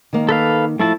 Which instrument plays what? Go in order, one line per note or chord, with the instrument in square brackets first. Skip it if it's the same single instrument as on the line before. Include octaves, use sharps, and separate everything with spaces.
[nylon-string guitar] D#3 A#3
[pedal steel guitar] A4 B4 F5
[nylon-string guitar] F3 [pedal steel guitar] A3 E4 A5